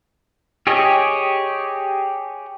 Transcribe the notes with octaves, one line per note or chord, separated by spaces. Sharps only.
G4 G#4 C#5 D#5